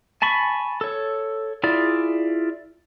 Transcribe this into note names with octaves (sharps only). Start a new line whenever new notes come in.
G#5 A5 B5 C#6
A4 C#5
E4 F4 G#4 D5